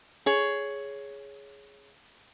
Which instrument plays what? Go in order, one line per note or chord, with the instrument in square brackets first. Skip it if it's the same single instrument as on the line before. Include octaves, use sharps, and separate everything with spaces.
[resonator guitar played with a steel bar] G#4 C#5